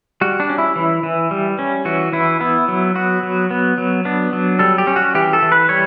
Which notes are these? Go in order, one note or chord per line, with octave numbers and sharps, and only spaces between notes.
G3 F#4
D4
C#4
E4
E3
E3
G3
C#4
E3 F#4
E3 E4
B3 E4
F#3
B3 F#4
F#3
B3
F#3
B3 D4
F#3
G3 A4
G4
C#4
F#4
E3 G4
A4
E3
B4
G3 C#5